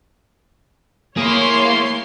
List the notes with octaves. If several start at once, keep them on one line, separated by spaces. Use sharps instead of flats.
A#3 E4 G#4 C#5 C6